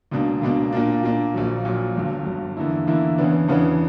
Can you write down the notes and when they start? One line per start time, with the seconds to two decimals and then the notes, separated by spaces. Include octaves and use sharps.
0.11 C#2 B2 A#3 D4
0.41 C#2 B2 A#3 D4
0.73 A#2 A#3 D4
1.03 A#2 A#3 D4
1.34 A#1 A#2 F#3
1.65 A#1 A#2 F#3
1.95 G1 G2 F#3
2.26 G1 G2 F#3
2.57 E2 D3 A#3 E4
2.87 E2 D3 A#3 E4
3.18 E2 C#3 E3 B3 D4
3.48 E2 C#3 E3 B3 D4